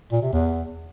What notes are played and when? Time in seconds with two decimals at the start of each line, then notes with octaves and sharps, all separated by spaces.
0.12 A#2
0.22 C3
0.33 E2